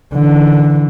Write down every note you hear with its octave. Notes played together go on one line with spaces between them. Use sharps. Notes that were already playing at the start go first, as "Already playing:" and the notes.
D3 E3